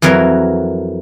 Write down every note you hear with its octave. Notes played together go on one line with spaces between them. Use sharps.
F2 E3 F#3 A#4